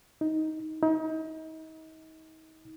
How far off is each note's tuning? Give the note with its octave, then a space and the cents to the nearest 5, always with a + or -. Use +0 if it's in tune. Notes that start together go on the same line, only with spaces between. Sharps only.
D#4 +10
D#4 +35